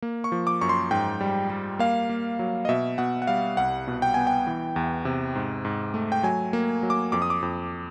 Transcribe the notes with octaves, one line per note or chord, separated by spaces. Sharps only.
A#3
C#6
F3
D6
F#2 C#6
C6
G#2 G5
G3
G3
A#3 F5
A#3
F#3
D#5
B2 E5
B2 F#5
F#5
G3 F5
C2 F#5
B2
G5
B3 G#5
G5
E3
E2
C3
G#2
G#2
A3
G5
F#3 G#5
A#3
F#3
D6
F2 D6
D#6
D6
F2